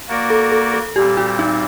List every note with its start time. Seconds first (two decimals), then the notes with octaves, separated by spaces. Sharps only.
0.08 A#3 F#4 A#4 D5
0.30 A4
0.52 A4
0.74 A4
0.95 A#2 G3 C4 G4
1.17 F#4
1.39 D#4